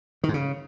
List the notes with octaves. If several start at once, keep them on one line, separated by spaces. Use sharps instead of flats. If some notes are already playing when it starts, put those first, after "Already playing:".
D#3
G#2
C#3